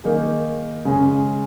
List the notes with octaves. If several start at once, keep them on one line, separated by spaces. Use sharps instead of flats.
D#3 A#3 D#4 G#4
C#3 G#3 C#4 G#4